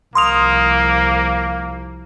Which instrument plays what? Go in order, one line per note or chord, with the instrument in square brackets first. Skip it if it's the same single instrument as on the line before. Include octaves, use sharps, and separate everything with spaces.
[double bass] C2 F3 [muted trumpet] A#3 [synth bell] C6 D#6 F7